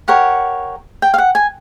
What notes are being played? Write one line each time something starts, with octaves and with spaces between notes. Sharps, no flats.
G4 A#4 C#5 F#5
G5
F5
F#5
G#5